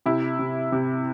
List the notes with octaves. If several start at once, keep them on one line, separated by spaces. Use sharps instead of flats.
C3 E4
C3
C3